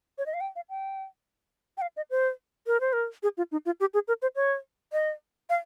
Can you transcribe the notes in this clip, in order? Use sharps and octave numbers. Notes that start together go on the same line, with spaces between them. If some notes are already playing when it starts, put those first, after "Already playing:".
C#5
D#5
F5
G5
F5
G5
G5
F5
D#5
C5
A#4
C5
A#4
G#4
F4
D#4
F4
G4
G#4
A#4
C5
C#5
D#5
F5